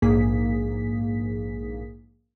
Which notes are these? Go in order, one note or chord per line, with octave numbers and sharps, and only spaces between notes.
A#1 G#2 A#3 G#4 B6